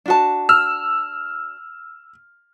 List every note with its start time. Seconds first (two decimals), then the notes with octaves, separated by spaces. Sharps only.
0.06 D4 F#4 A5
0.49 E6 F6